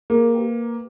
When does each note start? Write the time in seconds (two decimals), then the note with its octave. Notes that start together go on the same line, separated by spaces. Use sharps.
0.10 A#3 G#4 A#4
0.34 G4 B4 G5